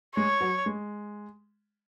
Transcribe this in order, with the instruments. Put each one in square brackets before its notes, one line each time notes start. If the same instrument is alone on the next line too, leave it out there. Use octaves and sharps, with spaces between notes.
[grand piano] G#3 [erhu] C#5
[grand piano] F#3
G#3